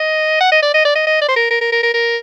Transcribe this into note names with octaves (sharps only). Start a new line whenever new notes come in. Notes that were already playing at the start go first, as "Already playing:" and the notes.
Already playing: D#5
F#5
D#5
D5
D#5
D5
D#5
D#5
D5
C5
A#4
A#4
A#4
A#4
A#4
A#4